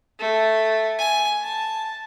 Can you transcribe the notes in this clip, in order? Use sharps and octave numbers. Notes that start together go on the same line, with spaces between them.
A3
G#5
A5